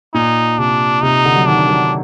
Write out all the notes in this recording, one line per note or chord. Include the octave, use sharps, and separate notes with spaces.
A#2 D#4
C3 D4
C3 D#4
D3
F#3
D#3 D4
F#3